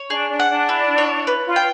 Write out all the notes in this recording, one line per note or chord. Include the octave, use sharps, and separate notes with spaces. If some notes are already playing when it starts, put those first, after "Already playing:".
Already playing: C#5
D4 G#4
D4
F#5
D4
E4
C#5
B4
F4
G5